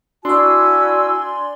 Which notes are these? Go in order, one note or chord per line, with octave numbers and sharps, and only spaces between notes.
D4 E4 F#4 D5 G#5 C6 E6